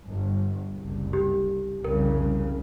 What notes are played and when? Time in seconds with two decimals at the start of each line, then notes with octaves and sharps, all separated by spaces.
0.10 G1
0.75 F#1 C2
1.13 G4
1.85 C2 F2 C#3 A#4